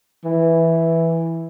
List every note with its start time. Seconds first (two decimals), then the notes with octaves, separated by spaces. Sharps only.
0.24 E3